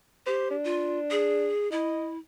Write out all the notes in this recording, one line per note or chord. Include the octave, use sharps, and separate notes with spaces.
G4 C5
D4
F4
G#4
E4 D#5